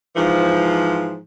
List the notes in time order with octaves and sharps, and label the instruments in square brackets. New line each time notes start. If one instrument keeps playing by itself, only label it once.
[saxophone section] G#2 E3 F3